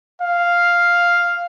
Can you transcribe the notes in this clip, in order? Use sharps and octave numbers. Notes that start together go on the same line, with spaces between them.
F5